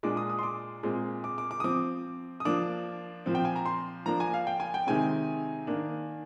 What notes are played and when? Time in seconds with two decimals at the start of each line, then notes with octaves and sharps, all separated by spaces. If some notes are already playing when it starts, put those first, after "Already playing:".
0.03 A#2 G#3 D4 D6
0.17 D#6
0.30 D#6
0.39 C6
0.43 D6
0.83 A#2 G#3 C4
1.24 D6
1.38 D6
1.51 D6
1.60 D#6
1.64 F3 C4 D6
2.40 D#6
2.45 F3 A#3 D4 D6
3.26 A#2 F3 C4
3.35 G5
3.45 G#5
3.56 A#5
3.65 C6
4.06 F3 A#3 D4 A#5
4.20 G#5
4.34 F5
4.47 G5
4.60 G#5
4.74 G5
4.87 C3 D#3 G#3 C4 G#5
5.67 D#3 A#3 D4